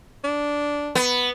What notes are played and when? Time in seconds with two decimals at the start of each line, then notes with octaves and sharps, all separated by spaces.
0.24 D4
0.95 B3